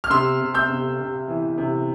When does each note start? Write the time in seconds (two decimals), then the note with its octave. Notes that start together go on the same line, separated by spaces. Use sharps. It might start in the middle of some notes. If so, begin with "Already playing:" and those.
0.04 F6
0.10 C3 C6 E6
0.40 C3
0.54 E6 G6
0.69 C3
0.99 C3
1.28 E3
1.58 C3